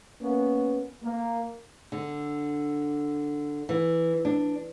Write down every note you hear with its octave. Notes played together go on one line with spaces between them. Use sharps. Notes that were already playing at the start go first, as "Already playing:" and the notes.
A#3 B3 C#4
A#3
D3
E3
D4